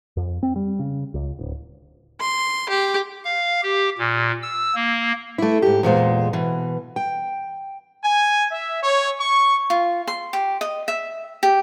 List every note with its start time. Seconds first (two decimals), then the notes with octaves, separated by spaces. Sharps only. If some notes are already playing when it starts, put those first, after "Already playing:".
0.17 F2
0.43 C4
0.56 G3
0.79 C#3
1.14 C#2
1.39 D1
2.20 C6
2.69 G4
3.25 F5
3.63 G4
3.99 A#2
4.42 E6
4.75 A#3
5.38 A3 E4
5.62 G#2 G4
5.83 E2 A#2 G#3 C5
6.33 B2 E3
6.96 G5
8.03 G#5
8.50 E5
8.82 C#5
9.20 C#6
9.70 F4
10.07 C6
10.33 G4
10.61 D#5
10.88 E5
11.43 G4